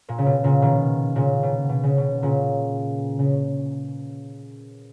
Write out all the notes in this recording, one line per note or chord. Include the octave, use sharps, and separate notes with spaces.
A#2
C#3
B2
A#2 C#3
B2 D#3
A#2 C#3
B2
B2
C#3
B2
A#2 C#3
C#3